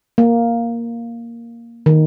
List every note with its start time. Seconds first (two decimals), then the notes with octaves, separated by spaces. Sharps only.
0.18 A#3
1.86 D#3